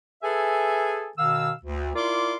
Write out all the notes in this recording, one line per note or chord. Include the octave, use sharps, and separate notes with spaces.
G#4 A4 B4 E5 G#5
B2 D#3 F5 E6
D2
E4 F4 A#4 D5 C6 D6